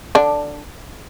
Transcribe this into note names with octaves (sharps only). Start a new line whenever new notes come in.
D3 D4